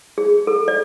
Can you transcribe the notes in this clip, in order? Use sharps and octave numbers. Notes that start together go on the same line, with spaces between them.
G#4
A4
D5